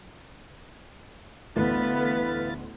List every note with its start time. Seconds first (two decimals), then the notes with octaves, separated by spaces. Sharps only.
1.56 A1 D2 A3 B3 E4 B4 F5 A6